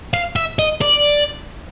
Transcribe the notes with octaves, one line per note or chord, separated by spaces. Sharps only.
F5
E5
D#5
D5